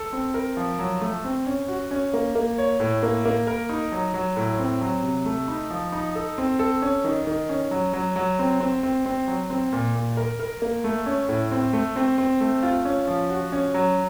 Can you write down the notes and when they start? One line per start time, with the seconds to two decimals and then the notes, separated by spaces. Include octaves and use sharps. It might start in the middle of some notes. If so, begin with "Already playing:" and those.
Already playing: A4
0.13 C4
0.34 A#4
0.57 F3
0.79 F#3
1.01 A3
1.24 C4
1.46 C#4
1.68 F#4
1.91 C#4
2.13 A#3
2.35 A#3
2.58 C#5
2.80 A2
3.03 A#3
3.25 A#3
3.47 A#4
3.69 D#4
3.92 F#3
4.14 F#3
4.37 A2
4.59 C4
4.81 F#3
5.03 C3
5.26 A3
5.48 D#4
5.70 F3
5.92 D#4
6.15 A4
6.38 C4
6.59 A4
6.82 C#4
7.04 D#3
7.27 D#3
7.49 C#4
7.71 F#3
7.93 F#3
8.16 F#3
8.39 C4
8.60 C4
8.83 C4
9.06 C4
9.28 F#3
9.50 C4
9.73 A#2
9.95 A#2
10.17 A#4
10.40 A#4
10.62 A#3
10.84 A3
11.06 C#4
11.29 A2
11.51 C4
11.73 A3
11.96 C4
12.18 C4
12.41 A3
12.63 F4
12.85 C#4
13.07 F3
13.30 F#4
13.52 C#4
13.74 F#3